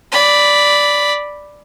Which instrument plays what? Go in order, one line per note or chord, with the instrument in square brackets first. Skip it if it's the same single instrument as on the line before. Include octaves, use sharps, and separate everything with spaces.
[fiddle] D5 B5